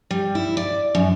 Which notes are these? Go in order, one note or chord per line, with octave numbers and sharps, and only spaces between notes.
G3
E4
D5
F#2